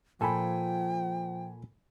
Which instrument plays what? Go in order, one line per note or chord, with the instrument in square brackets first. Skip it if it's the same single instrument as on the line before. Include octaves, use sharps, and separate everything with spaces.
[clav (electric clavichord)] A#2 A4 [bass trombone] F3 [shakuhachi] G5 [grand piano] G#5 B5